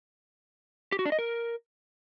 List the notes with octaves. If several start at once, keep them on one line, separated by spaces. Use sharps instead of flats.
G4
F#4
D4
D#5
A#4